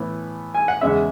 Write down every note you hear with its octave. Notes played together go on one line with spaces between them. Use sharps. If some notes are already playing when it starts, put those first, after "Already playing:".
Already playing: A2 E3 B3
G#5
F#5
E2 C#3 G#3 E5